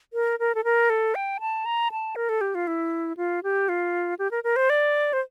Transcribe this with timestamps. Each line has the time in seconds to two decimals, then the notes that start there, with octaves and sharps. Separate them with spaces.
0.13 A#4
0.39 A#4
0.55 A4
0.64 A#4
0.90 A4
1.15 G5
1.40 A5
1.66 A#5
1.92 A5
2.16 A#4
2.29 A4
2.41 G4
2.55 F4
2.67 E4
3.17 F4
3.43 G4
3.69 F4
4.19 G4
4.31 A#4
4.44 A#4
4.56 C5
4.70 D5
5.13 C5